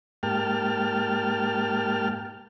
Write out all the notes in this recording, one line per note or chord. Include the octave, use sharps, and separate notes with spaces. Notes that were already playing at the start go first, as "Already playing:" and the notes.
G#2 A#3 G4 G5 A5 F6